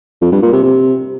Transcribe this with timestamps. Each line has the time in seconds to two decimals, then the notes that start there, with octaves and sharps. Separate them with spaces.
0.22 F2
0.32 G2
0.42 A#2
0.53 C3
0.63 C3